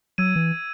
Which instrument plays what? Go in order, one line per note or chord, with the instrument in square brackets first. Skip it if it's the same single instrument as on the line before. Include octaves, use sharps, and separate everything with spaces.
[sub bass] F#3 [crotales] E6 G#6 D#7
[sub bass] E3